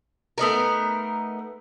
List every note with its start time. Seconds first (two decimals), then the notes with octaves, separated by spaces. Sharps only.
0.38 A3 B3 D#4 A#4